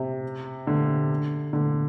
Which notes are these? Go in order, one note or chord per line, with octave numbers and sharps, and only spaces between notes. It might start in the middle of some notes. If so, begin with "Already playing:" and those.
Already playing: C3
D3
D3